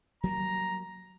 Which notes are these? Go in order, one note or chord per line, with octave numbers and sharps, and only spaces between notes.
F#3 G3 A#3 A#5